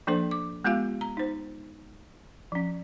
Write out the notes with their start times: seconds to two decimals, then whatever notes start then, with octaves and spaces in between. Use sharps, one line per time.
0.07 F3 A#3 D4 A4 C5
0.31 D6
0.65 G#3 B3 F4 G4 F5
1.01 A#5
1.17 D#4 C5
2.52 F3 C#4